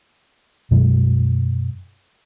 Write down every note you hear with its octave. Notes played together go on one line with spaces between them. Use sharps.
F#2 B2 F#3 G#3